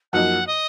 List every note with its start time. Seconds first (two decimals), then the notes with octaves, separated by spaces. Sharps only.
0.12 F#2 F3 A#3 D#4 F#4 F#5
0.46 D#5